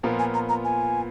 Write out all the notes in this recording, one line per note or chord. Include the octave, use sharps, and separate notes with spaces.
A#2 F3 B3 F4 A#4
G#5
A#5
A#5
G#5